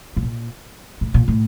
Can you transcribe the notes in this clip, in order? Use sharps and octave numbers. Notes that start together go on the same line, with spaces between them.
A2
A#2
A2
A#2
A2